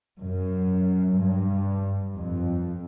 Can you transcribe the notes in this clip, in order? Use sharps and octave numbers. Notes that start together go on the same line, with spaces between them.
F#2
G2
F2